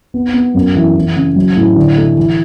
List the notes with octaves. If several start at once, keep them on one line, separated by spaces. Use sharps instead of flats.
B3
B3
F#2
E3
E3
C#3
F#3
A2
D3
A3
E3